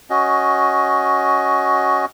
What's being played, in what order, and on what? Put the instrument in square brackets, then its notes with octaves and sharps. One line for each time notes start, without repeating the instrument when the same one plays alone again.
[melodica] C#4 F#4 D#5